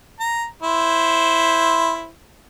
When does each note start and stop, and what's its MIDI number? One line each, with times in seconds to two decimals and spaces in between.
0.20 0.45 82
0.62 2.09 64
0.62 2.09 72